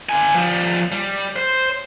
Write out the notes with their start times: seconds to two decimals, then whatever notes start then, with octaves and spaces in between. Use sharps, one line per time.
0.09 D3 G#5
0.34 F3 G3
0.92 G3
1.36 C5